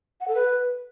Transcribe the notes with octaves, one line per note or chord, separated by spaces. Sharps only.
F#5
A4
B4